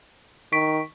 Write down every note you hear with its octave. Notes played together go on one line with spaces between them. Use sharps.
D#3 C#6 B6 D7